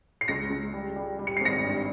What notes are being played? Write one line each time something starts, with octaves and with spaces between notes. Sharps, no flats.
C7
C#2 A#6 C#7
C#2
G3
G3
G3
C#7
C7
G#1 A#6 C#7
G2